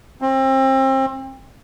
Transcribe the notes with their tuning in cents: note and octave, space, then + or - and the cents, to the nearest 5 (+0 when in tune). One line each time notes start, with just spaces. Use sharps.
C4 +30